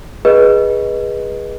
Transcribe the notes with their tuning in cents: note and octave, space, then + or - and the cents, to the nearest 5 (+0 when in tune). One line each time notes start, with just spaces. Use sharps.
G#4 -10 B4 -25 D#5 +0